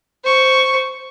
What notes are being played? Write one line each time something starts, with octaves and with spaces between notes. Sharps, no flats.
C5 C#6